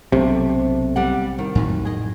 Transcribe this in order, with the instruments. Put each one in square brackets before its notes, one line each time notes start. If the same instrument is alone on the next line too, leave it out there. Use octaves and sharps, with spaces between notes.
[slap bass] B1 [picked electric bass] C3 [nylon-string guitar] A3 D4
[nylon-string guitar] G3 G4 F#5
D#3
[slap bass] F2 A2 F#3
[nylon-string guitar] G#4 D#5